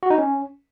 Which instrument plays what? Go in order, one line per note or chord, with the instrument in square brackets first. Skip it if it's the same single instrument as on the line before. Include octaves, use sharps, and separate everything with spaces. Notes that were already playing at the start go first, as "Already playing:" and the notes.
[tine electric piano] F#4
D#4
C#4